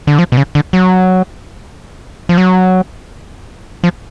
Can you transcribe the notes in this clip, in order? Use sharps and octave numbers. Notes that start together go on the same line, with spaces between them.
D3
F3
B2
C#3
D3
F#3
F3
F#3
F3